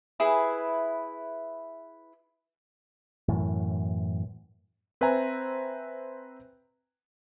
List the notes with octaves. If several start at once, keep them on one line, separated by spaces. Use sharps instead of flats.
E4 G#4 B4
F#2 A2 E3
C4 B4 C5 E5 G#5 A#5